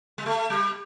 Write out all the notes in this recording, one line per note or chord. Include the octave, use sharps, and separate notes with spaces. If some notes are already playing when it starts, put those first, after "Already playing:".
G#3
A3
G3